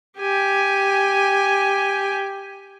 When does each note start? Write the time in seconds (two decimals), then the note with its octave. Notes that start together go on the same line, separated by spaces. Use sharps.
0.19 G4 G#5